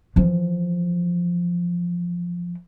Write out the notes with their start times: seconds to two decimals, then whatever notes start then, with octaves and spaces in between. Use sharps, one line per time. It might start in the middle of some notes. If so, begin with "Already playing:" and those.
0.16 E3 F3